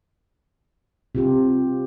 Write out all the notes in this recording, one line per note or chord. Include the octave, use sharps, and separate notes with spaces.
C3 F4 G4